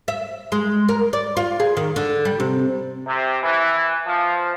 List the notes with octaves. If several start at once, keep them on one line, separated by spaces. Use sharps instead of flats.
E5
G#3
A#4
D5
F4
G#4
D#3
D3
G3
C3
C3
E3
F3